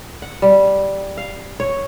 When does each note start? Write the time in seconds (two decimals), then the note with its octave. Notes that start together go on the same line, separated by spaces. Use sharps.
0.22 F#5
0.42 G3
1.17 F5
1.60 C#5